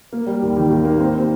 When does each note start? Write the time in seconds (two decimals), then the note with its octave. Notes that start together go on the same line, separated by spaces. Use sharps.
0.13 A#3
0.27 G3
0.42 D#2
0.57 D#3
0.70 D#2
0.85 A#3
0.99 C4
1.14 C4